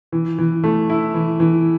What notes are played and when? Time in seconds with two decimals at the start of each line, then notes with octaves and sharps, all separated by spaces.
0.12 E3
0.38 E3
0.64 A3
0.90 E4
1.14 E3
1.40 E3